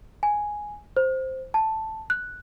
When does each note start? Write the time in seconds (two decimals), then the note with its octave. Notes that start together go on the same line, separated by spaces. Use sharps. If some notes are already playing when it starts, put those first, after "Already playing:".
0.23 G#5
0.97 C5
1.54 A5
2.10 F#6